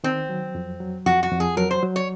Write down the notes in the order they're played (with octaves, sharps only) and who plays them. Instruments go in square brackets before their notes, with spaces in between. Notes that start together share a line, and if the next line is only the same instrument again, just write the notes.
[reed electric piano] D#3 [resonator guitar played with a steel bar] C4
[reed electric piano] F#3
F2
F#3
[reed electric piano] F2 [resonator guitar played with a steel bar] F#4
[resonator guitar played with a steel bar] F#4
[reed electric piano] F2
[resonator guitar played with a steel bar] G#4
[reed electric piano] F#3 [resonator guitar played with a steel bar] A#4
[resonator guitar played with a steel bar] C5
[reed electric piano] F#3
[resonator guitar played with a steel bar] C#5